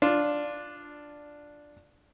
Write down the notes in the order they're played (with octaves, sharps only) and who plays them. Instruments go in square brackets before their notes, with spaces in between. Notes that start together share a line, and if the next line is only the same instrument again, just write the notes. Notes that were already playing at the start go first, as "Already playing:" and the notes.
[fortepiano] D4 F4